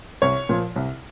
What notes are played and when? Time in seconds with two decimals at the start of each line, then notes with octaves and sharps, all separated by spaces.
0.22 C2 C#5
0.49 A#2 F3
0.76 C2